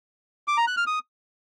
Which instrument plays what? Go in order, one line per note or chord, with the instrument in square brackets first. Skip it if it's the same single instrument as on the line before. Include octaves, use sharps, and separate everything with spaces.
[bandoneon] D6
A#5
F#6
F6
D#6